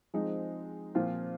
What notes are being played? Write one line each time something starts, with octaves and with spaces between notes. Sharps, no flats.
F3 G#3 C4 D#4
A#2 F3 C4 F4